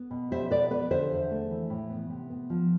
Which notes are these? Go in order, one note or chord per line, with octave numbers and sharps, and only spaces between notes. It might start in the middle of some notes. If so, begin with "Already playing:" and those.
Already playing: B3
B2
G3 C5 E5
B2 B4 D5
B3 B4 D5
D3 C5 E5
E2
A3
E3
A2
B3
C3
B3
F3